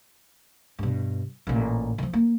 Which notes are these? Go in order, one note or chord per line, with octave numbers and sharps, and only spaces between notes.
G2 B2
A1 A#2
D#3 F3
A#3